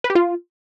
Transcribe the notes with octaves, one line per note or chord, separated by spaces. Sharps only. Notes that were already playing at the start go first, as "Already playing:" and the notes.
B4
G4
F4